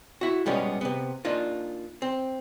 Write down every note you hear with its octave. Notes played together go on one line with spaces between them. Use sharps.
E4 F#4
B2 G3 G#3 B3 C#4
C3 B3
A#3 D4 D#4 F4
C4